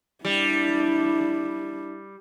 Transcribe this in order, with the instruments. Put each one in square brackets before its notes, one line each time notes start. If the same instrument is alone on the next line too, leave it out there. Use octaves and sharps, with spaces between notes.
[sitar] G3 [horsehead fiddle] D4 E4